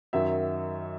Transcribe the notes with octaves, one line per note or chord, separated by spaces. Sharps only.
F#2 D#3 F#3 E5